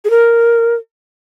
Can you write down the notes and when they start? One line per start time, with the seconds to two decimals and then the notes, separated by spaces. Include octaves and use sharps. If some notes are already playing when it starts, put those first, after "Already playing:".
0.05 G#4
0.10 A#4